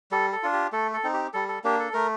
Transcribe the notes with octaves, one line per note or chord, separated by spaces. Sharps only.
G3 A4
A4
D4 F4
G4
A3 A4
A4
C4 D#4
G4
G3 A4
A4
A#3 D4 G4
A4
A3 A#4